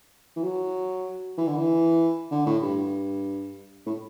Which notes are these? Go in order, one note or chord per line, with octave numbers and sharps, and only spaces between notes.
E3
F#3
E3
D3
E3
D3
A2
G2
A2